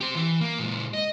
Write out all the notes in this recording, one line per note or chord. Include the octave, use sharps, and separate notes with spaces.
G4 C5
E3
A#3
A#2 G#3
D#5